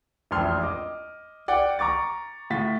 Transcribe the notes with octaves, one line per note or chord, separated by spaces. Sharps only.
E1 A1 F2 C6 F6
D#5 D6
D5 F#5 G5
A#5 C#6 D6 A6
A2 F4 F#5 A6 B6